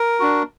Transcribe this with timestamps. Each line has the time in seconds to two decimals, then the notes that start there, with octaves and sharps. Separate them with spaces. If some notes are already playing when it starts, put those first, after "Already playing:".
Already playing: A#4
0.20 D4 F#4